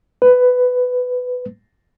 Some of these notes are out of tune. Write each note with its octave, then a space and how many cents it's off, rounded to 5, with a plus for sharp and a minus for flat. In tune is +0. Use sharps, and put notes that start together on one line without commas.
B4 +10